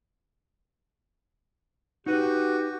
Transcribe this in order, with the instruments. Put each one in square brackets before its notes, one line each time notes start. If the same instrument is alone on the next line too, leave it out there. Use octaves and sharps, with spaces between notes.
[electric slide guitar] D#4 B4 F#5 [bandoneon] F#4 [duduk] G4